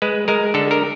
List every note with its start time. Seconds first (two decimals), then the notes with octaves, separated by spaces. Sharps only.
0.02 G#3 B4
0.28 G#3 A#4
0.54 D3 A4
0.71 A#4